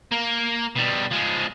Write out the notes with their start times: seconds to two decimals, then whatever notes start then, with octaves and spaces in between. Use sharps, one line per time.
0.12 A#3
0.76 B2 G3
1.11 F3 G#3